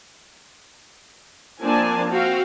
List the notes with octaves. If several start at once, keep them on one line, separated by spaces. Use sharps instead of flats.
F3 A#3 C4 D4 G#5 A5
C4 F#4 F5 G5